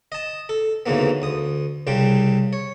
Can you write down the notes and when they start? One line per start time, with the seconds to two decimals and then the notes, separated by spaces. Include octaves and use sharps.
0.12 D#5 A5
0.49 A4
0.86 D2 G#2 C#3 E3 A#3 B3
1.22 D2 D#6
1.87 C2 C#3 G3 G5
2.53 C#5